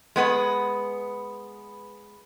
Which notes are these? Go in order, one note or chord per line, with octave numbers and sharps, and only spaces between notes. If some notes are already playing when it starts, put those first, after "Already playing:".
G#3 B3 B4